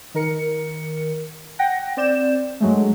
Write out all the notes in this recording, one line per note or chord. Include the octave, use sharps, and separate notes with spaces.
D#3 A#4 C#7
F#5 G5 A#6
C4 D5 G6 E7
G2 F#3 G#3 A3